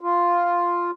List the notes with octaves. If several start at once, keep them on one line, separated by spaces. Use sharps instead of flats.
F4